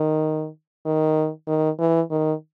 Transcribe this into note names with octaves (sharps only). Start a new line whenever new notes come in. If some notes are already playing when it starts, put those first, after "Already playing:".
Already playing: D#3
D#3
D#3
E3
D#3